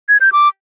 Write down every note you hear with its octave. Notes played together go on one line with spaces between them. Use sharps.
G#6
G6
D6